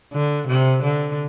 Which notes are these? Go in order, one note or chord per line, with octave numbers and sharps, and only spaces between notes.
D3
C3
D3